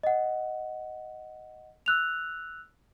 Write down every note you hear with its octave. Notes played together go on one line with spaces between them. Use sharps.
D#5 F#5
E6 F#6 F7